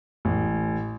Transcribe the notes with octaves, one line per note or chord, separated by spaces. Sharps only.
A1